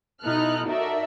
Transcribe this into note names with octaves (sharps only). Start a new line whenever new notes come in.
B2 D#4 E4 A4 F6 F#6
D#4 F#4 A4 A#4 D5 E5